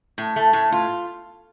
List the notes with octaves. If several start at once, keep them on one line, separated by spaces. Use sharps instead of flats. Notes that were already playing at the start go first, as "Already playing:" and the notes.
A2
A3
A2
F4